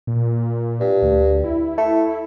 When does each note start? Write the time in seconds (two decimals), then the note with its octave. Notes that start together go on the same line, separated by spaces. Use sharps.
0.07 A#2
0.80 G2
1.02 D2
1.44 E4
1.78 A3